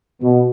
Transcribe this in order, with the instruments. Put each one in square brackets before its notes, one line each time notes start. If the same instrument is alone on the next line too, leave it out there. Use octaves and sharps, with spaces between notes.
[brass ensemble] B2